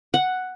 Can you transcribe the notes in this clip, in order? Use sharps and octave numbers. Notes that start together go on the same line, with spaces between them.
F#5